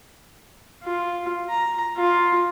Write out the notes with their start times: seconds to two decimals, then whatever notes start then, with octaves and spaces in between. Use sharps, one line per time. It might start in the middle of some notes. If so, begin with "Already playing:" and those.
0.83 F4
1.49 A#5
1.97 F4